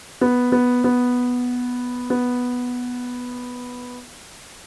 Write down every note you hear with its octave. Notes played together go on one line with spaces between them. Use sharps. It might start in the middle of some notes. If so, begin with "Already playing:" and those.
B3
B3
B3
B3